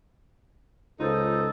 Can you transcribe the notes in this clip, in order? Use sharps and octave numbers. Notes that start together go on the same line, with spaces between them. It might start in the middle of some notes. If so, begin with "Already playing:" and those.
C#2 D#4 F4 A4 C5 D#6